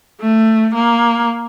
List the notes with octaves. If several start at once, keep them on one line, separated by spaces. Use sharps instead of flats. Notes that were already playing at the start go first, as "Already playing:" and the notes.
A3
A#3